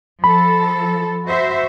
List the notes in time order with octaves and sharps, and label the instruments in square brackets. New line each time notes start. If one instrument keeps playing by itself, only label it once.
[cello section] F3 A4 [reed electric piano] B5
[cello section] F#4 C5 E5